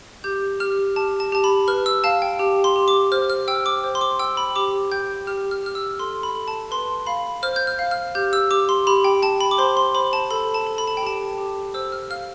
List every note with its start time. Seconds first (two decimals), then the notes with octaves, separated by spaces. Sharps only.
0.24 G4 G6
0.60 G4 F6
0.96 G4 A5
1.20 A5
1.32 G4 A5
1.44 B5
1.68 B4 F6
1.86 E6
2.04 F5 A5
2.22 G5
2.39 G4
2.64 C6
2.76 G4
2.88 D6
3.12 C5 F6
3.30 F6
3.48 G5 E6
3.66 D6
3.84 C5
3.95 C6
4.01 D6
4.19 G5 E6
4.37 B5
4.56 G4 D6
4.92 G5 G6
5.27 G4 F6
5.51 F6
5.64 G4 F6
5.75 E6
5.99 A4 C6
6.23 B5
6.35 A4
6.48 A5
6.71 B4 C6
7.07 F5 B5
7.43 C5 F6
7.56 G6
7.67 F6
7.79 F5
7.91 F6
8.15 G4 G6
8.33 E6
8.51 G4 D6
8.69 C6
8.87 G4 B5
9.04 G5
9.22 G5 A5
9.41 B5
9.51 D6
9.58 C5 C6
9.77 C6
9.94 C5 B5
10.13 A5
10.31 A4 B5
10.54 A5
10.67 A4
10.78 B5
10.88 A5
10.97 G5
11.03 G4 A5
11.38 G4
11.74 C5 E6
11.92 F6
12.10 F5 F6